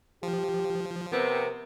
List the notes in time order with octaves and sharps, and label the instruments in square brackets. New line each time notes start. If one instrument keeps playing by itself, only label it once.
[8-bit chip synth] F3 [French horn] G4
[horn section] C3 B3 C4 [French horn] A#4